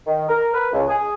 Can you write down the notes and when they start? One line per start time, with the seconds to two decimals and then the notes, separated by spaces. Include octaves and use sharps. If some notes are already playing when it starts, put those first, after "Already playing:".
0.07 D#3
0.29 A#4
0.54 B4
0.73 C#2
0.88 G#4